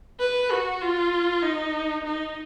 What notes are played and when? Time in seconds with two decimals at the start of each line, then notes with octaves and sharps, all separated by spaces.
0.19 B4
0.51 F#4
0.82 F4
1.42 D#4
2.03 D#4